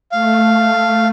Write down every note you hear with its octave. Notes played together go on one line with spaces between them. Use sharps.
A3 F5